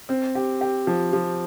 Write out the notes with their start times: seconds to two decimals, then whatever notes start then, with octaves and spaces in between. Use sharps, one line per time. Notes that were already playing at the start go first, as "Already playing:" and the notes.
0.09 C4
0.35 G4
0.61 G4
0.87 F3
1.13 F3